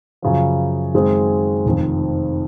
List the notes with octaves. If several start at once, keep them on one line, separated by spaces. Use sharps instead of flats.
F#2 C#3 F3
F#2 D#3 G#3 C4
F1 F2 D#3